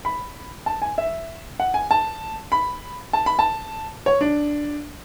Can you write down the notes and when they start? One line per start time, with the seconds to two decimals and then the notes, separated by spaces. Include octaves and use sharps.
0.05 B5
0.66 A5
0.82 G#5
0.98 E5
1.60 F#5
1.74 G#5
1.91 A5
2.52 B5
3.13 A5
3.26 B5
3.39 A5
4.06 C#5
4.21 D4